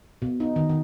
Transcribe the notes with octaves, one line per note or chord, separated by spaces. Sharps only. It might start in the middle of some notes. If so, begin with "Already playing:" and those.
B2
D#4
D#3
D#3